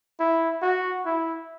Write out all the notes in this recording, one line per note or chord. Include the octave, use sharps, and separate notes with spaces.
E4
F#4
E4